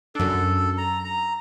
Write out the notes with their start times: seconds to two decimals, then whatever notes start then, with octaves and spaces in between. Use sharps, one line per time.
0.15 F#2 D4 A4
0.78 A#5
1.05 A#5